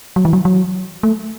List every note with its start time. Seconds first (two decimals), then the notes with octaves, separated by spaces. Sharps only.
0.16 F#3
0.25 E3
0.33 F#3
0.45 F#3
1.03 A3